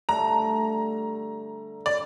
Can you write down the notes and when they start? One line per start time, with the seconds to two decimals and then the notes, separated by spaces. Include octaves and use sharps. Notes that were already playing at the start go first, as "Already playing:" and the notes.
0.09 D3 G3 A3 A#5
1.86 D5